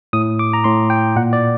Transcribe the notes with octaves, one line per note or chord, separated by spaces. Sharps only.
A2 D#6
D6
A#5
A2 C6
G5
A#2 F#5
D5